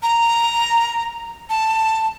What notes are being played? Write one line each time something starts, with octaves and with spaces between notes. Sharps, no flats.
A#5
A5